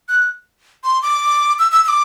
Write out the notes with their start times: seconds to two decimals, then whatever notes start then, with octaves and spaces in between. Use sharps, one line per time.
0.09 F#6
0.84 C6
1.02 D6
1.59 E6
1.71 E6
1.84 E6
1.88 D6